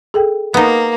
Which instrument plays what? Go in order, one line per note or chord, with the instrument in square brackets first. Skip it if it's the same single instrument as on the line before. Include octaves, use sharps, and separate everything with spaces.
[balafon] G#4 A4 G5
[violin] A#3 [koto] B3 D#4